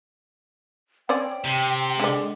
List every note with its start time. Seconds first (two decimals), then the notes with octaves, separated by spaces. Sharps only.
1.09 C4 C#4 D5 G5
1.46 C3
2.00 D3 G#3 D5